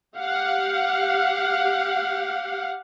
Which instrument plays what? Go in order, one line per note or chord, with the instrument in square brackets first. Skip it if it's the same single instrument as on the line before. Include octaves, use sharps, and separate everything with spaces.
[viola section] G4 F5 F#5